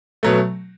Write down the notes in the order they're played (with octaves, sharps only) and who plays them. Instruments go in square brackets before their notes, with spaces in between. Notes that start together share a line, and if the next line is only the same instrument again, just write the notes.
[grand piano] B2 F#3 A3